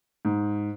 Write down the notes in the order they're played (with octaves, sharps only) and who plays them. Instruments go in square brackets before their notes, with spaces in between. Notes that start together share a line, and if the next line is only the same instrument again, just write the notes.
[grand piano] G#2